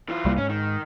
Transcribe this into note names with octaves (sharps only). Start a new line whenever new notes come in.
E3 F4
C2 G3 A#3
G#2 C#4
D#3